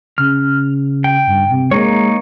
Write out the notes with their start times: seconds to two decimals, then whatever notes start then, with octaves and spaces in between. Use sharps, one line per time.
0.18 C#3 F6
1.04 G5
1.27 G2
1.50 C3
1.71 G#3 A#3 D#4 C#5